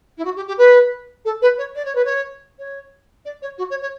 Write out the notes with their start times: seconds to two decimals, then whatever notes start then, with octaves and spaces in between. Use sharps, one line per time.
0.17 E4
0.24 F#4
0.36 G4
0.47 G4
0.58 B4
1.25 A4
1.41 B4
1.57 C#5
1.75 D5
1.85 C#5
1.95 B4
2.04 C#5
2.58 C#5
3.25 D5
3.42 C#5
3.58 F#4
3.70 C#5
3.81 C#5